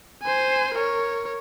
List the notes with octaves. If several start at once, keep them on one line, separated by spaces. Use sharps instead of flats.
C5 G#5
A#4 C#5